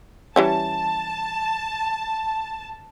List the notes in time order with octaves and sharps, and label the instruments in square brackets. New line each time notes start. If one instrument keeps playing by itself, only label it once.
[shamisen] E3 G3 C#4 [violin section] A5